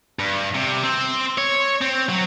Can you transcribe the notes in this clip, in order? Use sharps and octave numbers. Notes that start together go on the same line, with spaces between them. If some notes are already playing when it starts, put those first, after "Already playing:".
G2
C3
C4
C#5
C4
F#3